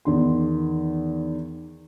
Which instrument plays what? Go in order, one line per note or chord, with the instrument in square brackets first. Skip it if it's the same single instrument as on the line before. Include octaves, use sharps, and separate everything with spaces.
[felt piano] E2 D#3 C6